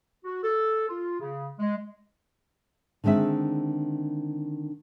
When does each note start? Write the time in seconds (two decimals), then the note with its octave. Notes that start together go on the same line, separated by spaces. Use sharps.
0.24 F#4
0.43 A4
0.88 F4
1.20 C#3
1.59 G#3
3.04 D3 D#3 G#3 C4 E5